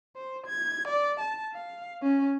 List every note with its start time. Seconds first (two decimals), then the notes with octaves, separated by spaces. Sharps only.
0.16 C5
0.47 G#6
0.88 D5
1.20 A5
1.54 F5
2.03 C#4